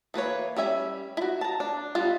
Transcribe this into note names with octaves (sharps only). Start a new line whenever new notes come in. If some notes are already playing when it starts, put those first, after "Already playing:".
E3 A#3 B4 C#5
G3 C#4 E5 G#5
E4 F#4
A5 A#5
D4
G3 B3 F4